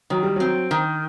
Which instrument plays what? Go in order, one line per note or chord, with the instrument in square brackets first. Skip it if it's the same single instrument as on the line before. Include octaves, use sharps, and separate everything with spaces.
[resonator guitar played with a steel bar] D#3 [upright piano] F#3
[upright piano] G3
[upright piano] F#3 [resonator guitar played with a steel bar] C4
[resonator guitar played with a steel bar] D#3